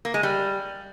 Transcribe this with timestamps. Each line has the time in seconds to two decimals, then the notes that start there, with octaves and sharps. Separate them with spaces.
0.05 A#3
0.14 G#3
0.23 G3